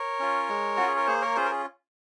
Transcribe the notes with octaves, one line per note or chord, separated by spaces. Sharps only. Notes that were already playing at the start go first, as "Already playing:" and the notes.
Already playing: A#4 C#5
C#4 F4
G#3
C#4 F4 F#4
G#4
A#4
A#3 G#4 C5
A#4 C#5
C#4 F4 G#4 C5
A#4
G#4